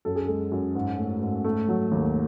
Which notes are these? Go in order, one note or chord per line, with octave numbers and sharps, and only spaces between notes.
F#2 A4
G#4
G#3 A4
F#2
G#2
A3
G#2
A3
F#3
D#2